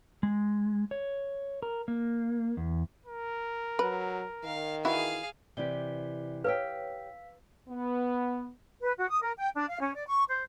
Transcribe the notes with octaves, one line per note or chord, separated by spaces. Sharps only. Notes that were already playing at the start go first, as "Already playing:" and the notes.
G#3
C#5
A#4
A#3
E2
A#4
F#3 B4
D#3 F5
E3 E4 F#4 G#4 F5
C3 E3 G4 D5 G7
G4 B4 C#5 F5 G5 E6 B6
B3
B4
F#4
D#6
A#4
G5
D4
F5
C#4
D5
C#6
C5